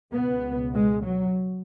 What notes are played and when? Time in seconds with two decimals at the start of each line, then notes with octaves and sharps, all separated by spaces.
0.13 C#2 B2 B3
0.74 G#3
1.04 F#3